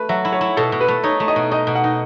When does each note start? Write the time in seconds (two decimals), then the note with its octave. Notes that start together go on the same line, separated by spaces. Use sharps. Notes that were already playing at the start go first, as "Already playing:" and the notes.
Already playing: A3 B4
0.09 F#3 E5
0.25 E4
0.33 C#5
0.41 E4
0.57 B2 A4
0.72 B2
0.81 B4
0.88 A3
1.04 D#4 C#5
1.20 A3
1.28 D#5
1.36 B2
1.51 D#4 D#5
1.67 B2
1.75 F#5
1.84 D#4